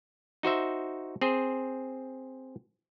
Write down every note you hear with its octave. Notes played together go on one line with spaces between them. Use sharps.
D#4 F#4 C5 E5
C4 G#4 C5